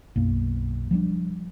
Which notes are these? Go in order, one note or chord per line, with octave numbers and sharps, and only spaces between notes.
B1 F#2 A#3
F3 G3 A3 D4